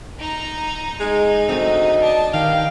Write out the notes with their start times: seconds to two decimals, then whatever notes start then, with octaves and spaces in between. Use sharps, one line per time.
0.19 D#4 A#5
1.00 G#3 D#4
1.49 D2 A3 C4 D#5
2.01 D4 A5
2.34 G2 D#3 F5 G5